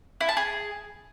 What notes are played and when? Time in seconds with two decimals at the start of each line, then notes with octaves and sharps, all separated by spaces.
0.21 E4
0.29 A5
0.37 G#4